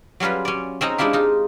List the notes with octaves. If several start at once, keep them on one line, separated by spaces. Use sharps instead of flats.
F#3 G3 C#4 F4 B4
C#4 D5
C4 C#4 D#4 A#5
G#3 D4 E4 F4 G4
D#4 F4